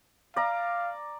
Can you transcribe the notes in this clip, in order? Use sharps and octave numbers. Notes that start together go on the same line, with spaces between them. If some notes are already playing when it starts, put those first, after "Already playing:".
D5 F5 A#5